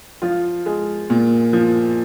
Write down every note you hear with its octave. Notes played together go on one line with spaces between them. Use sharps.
F3 F4
G#3
A#2
F3